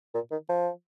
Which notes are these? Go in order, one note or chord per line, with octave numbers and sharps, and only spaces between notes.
A#2
D#3
F3